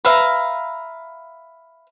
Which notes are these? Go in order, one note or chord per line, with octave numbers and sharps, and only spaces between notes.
B4 E5 F5 A#5